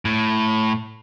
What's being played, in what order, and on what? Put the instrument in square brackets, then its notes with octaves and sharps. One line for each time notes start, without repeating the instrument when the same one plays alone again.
[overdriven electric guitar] A2